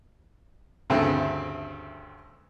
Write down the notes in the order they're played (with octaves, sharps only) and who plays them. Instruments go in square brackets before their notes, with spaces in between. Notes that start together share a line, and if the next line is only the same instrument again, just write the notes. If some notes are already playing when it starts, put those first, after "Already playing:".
[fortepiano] D2 G2 C#3 A3 C4 E5